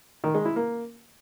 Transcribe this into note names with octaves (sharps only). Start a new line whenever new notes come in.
D#3
G#3
E4
A#3